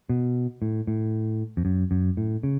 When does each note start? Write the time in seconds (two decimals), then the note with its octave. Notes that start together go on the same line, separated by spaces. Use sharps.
0.09 B2
0.62 A2
0.87 A2
1.57 F2
1.65 F#2
1.91 F#2
2.17 A2
2.43 C#3